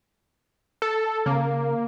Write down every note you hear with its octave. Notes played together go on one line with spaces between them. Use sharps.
A4
C#3 A#3